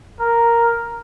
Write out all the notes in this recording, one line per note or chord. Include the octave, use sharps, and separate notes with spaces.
A#4